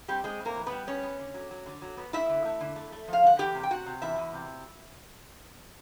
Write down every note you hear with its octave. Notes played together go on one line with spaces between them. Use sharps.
G3 C4 G4
G#3 C4 G#4
A2
A#3 A#4
E3
B3 B4
G3
B3 C#4 C#5
B3
D3
F#3
F#3
D3
F#3
B3
A3 E4 E5
D3
A3
D3
A3
A3
F3
F5
D3 F#5
E2 G4 G5
C3
G5
C3 F#4 F#5
C3
E2 E4 E5
E2
C3